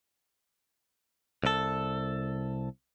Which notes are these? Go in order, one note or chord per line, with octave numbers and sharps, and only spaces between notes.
C2 A4